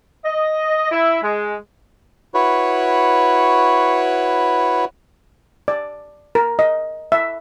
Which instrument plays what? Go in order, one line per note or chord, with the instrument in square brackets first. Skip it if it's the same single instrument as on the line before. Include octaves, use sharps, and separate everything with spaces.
[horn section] D#5
E4
G#3
[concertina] E4 F#4 B4 C#5
[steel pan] D5
A#4
D#5
E5